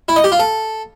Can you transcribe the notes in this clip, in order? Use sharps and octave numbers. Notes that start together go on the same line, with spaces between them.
E4
D#5
G4
F4
A4